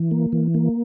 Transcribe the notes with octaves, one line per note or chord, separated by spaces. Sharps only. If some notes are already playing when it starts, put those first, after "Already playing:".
Already playing: E3
A#3
E3
A#3